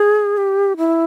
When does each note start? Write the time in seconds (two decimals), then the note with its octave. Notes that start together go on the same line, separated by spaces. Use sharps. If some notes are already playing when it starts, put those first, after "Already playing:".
Already playing: G#4
0.37 G4
0.77 E4